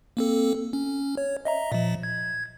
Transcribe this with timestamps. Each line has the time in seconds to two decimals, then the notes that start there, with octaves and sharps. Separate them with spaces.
0.17 A#3 C4 A4
0.73 C#4
1.17 C#5
1.45 D#5 E5 A#5
1.72 A#2 F3
2.03 G#6